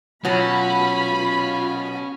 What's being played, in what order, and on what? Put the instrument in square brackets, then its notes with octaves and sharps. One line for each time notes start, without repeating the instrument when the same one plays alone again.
[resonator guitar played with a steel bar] B2 F#3 [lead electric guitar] C#4 C#5 [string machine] F4 [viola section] B5